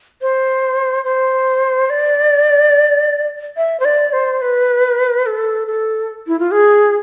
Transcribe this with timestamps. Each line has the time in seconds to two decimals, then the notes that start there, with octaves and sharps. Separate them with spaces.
0.22 C5
1.05 C5
1.90 D5
3.57 E5
3.80 C5
3.85 D5
4.13 C5
4.42 B4
5.26 A4
5.67 A4
6.27 E4
6.39 F4
6.51 G#4